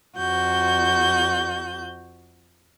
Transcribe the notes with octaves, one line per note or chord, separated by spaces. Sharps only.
F2 F#4 G6